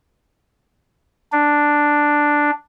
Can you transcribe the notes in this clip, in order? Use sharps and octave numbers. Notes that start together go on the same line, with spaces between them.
D4